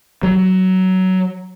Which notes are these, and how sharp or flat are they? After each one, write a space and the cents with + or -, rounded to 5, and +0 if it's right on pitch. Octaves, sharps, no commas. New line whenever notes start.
F#3 +15